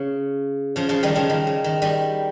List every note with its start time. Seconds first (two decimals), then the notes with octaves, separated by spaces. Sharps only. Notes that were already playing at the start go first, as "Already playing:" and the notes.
Already playing: C#3
0.76 C#3 F3
0.89 C#3 F3
1.03 D#3 G3
1.16 C#3 F3
1.30 D#3
1.47 C#3
1.64 D#3
1.82 D#3 G3